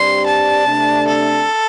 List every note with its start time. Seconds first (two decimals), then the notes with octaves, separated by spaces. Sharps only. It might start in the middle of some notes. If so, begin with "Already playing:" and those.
Already playing: G2 G3 C4 G4 D5 C6
0.26 A5
0.67 C3 A3 D4
1.07 A4